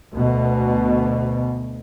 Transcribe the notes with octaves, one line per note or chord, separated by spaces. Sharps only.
D2 B2